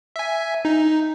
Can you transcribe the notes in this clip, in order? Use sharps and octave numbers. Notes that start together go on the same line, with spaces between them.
E5 G#5
D#4